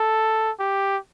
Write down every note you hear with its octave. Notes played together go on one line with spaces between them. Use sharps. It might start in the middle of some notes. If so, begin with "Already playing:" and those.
Already playing: A4
G4